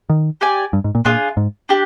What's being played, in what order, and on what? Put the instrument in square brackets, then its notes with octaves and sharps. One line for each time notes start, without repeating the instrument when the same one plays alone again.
[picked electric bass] D#3
[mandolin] G4 D5 G#5
[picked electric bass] G2
G#2
A#2
[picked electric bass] A#2 [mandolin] D4 F4 G#4
[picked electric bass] G#2
[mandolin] D4 G4